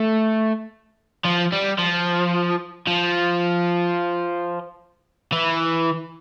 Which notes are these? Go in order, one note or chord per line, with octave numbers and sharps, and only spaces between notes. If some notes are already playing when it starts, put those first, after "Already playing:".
Already playing: A3
F3
G3
F3
F3
E3